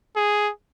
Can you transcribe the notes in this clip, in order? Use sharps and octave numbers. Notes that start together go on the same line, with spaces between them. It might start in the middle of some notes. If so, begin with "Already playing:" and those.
G#4